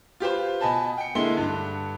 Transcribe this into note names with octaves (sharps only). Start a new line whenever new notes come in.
F4 G4 B4 C5
B2 D#5 G#5 A5 B5
G5 C#7
D3 G#3 A#3 E4 C6 G7
G2 D3